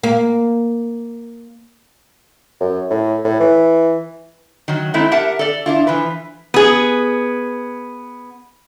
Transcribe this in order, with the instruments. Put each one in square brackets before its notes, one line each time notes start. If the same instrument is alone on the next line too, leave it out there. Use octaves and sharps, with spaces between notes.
[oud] A#3
[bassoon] F#2
A2
A2
E3
[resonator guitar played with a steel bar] D#3 F#3
G#3 A3 C4 D#4 E4
G4 A#4 E5 F#5 A5
A4 D5
D4 E4 F4
E3 F3 B4
B3 G#4